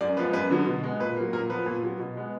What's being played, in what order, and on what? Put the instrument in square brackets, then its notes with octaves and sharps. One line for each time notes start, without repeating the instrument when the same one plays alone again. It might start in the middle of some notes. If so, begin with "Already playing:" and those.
[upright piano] F#2 D5
F3 G#3 B3 B4
F#2 B4
D3 F#3 B3
B2
G#3 B3
A#2 B4
F#3 A#3
A#2 A#4
F3 B3 B4
A#2
F#3 B3
B2
G#3 B3